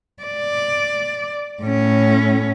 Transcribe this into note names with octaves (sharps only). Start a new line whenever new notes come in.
D5
A2 C#4